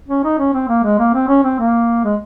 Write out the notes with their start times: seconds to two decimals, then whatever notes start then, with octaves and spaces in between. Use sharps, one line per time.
0.08 C#4
0.24 D#4
0.38 C#4
0.53 C4
0.68 A#3
0.84 G#3
0.99 A#3
1.14 C4
1.28 C#4
1.44 C4
1.59 A#3
2.04 G#3